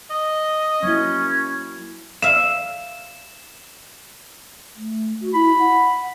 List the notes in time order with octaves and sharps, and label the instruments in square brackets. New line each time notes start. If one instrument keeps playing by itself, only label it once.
[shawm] D#5
[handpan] F#3 A#3 E4 [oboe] C#4
[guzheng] E5 F5 [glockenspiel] E7
[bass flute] A3
F#4
[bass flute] E4 [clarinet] B5
[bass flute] F#5